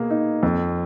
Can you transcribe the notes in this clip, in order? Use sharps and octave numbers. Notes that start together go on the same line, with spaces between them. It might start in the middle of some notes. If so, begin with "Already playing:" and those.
Already playing: B2 A#3 G#4
D#4
F2